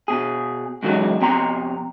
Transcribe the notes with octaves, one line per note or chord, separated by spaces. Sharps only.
B2 G#4
G#2 C#3 E3 F#3 G#3
F2 C3 B3 G5 A#5 C6